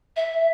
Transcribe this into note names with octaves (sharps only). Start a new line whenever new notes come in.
E5